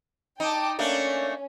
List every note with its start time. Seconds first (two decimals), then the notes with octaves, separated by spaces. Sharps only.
0.40 D#4 G5 A5 D6
0.79 A3 A#3 C#4 D4